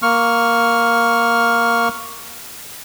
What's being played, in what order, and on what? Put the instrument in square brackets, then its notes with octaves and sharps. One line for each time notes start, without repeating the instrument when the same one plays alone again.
[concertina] A#3 C#6 F6